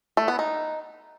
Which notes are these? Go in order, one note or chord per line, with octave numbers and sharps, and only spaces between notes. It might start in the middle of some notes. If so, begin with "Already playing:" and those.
A3
B3
D#4